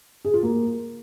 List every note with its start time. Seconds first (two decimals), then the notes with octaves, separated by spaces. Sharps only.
0.25 G#4
0.34 F4
0.43 A#3